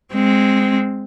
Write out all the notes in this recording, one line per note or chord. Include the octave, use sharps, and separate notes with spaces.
G#3 C4